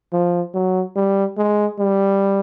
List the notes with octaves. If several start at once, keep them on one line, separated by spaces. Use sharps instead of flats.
F3
F#3
G3
G#3
G3